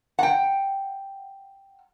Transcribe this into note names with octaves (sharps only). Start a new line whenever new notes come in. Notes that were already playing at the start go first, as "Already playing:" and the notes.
F#5 G5